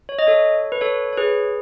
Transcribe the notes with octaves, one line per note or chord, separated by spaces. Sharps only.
C#5
D#5
A4 C#5
B4
A4 C#5
C#5
G#4 B4